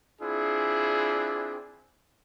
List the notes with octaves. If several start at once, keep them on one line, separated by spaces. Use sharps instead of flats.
C4 D4 E4 F4 G#4